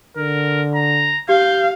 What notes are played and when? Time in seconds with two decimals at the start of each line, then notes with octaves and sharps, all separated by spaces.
0.17 D3 A#4
0.75 A#5
1.29 G4 F5 G6